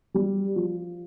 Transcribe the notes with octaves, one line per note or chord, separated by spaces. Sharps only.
G3
F3